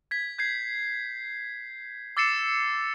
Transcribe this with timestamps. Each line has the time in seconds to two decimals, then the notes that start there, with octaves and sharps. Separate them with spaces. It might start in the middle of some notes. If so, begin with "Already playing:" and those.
0.11 G#6 B6
0.38 G6 G#6 C7
2.17 D6 E6 A6 C7 C#7 E7